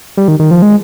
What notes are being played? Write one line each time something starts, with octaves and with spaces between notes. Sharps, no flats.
G3
D#3
D#3
F3
G#3